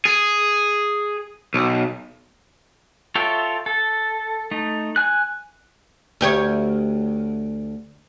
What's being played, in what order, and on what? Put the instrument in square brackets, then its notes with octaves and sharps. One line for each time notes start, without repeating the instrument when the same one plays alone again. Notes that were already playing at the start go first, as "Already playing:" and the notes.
[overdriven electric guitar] G#4
B1
[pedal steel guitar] F4 A4 C#5 E5 G5
A4
A3 D#4
G#5 F#6
[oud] D2 G4 C#5